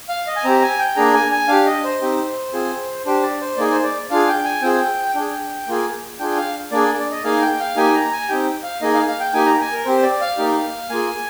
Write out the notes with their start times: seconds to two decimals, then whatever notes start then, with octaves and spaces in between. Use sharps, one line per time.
0.09 F5
0.27 D#5
0.36 G#5
0.44 C4 G4 A#5
0.62 G#5
0.79 G5
0.96 A#3 D4 G#4 A#5
1.14 G#5
1.32 G#5
1.48 D4 G4 F5
1.66 D#5
1.84 C5
2.02 C4 D#4 G4
2.53 C4 F4 G#4
3.05 D4 G4 C5
3.23 D5
3.41 C5
3.57 A#3 D#4 G#4 D5
3.71 C5
3.83 D5
4.10 D4 F4 G#4 F5
4.28 G5
4.45 G#5
4.62 C4 F4 G#4 G5
5.15 D4 G#4 G5
5.68 A#3 F4 G#4
6.19 D4 F4 G#4 G5
6.37 F5
6.72 A#3 D4 G#4 D5
6.99 D5
7.12 D#5
7.24 A#3 D#4 G#4 F5
7.42 G5
7.60 F5
7.76 A#3 D#4 G4 G#5
7.94 A#5
8.12 G#5
8.29 C4 D#4 G4 G5
8.63 F5
8.81 A#3 D#4 G#4 D#5
8.94 F5
9.08 F5
9.20 G5
9.33 A#3 D#4 G4 G#5
9.46 A#5
9.60 G#5
9.73 A#4
9.85 C4 G4 C5
10.03 D5
10.21 F5
10.38 A#3 D#4 G4
10.90 A#3 F4 G#4 G#5